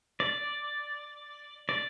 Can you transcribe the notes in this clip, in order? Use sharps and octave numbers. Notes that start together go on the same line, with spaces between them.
D5
D5